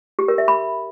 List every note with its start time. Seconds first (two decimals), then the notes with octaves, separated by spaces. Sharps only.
0.19 G4
0.28 A#4
0.38 E5
0.48 B5